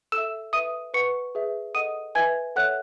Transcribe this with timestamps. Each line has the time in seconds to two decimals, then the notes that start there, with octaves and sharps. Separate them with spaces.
0.12 A4 E6 E7
0.17 E5
0.53 B4 E5 D#6 D#7
0.94 B4 F#5 C#6 C#7
1.35 G#4 B4 E5
1.74 A4 D#5 F#5 D#6 D#7
2.15 B4 E5 G#5 G#6
2.56 A4 C#5 E5 F#5 F#6